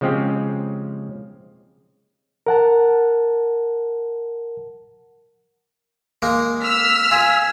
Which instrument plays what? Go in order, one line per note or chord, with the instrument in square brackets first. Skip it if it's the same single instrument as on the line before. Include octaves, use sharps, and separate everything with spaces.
[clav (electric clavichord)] C#3 F3 G#3 C4 C#4 G4
[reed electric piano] A#4 F#5 A5
[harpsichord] G#3 A#3 D#4
[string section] E6 F6 B6
[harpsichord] F4 [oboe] G#5